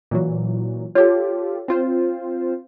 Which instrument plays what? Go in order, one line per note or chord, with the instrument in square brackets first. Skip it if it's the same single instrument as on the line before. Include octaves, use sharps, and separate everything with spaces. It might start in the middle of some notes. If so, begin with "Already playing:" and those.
[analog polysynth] A#2 E3 F#3
[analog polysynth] F4 G4 A4 [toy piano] C#5
[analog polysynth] C4 F4 C5